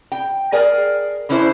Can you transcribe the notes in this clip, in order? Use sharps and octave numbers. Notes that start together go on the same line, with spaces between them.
G5
G#4 A#4 D5 G#5
D3 E3 C#4 D4 E4 C5